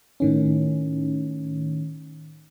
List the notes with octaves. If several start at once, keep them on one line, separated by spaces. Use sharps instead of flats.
A2 D#3 C#4